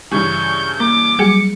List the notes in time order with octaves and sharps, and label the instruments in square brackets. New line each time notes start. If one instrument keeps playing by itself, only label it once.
[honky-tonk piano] G2 C#3 E3 [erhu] C#6 [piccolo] G6
[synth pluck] A#3 [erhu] D6
[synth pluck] F#3 G3 G#4 [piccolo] C#7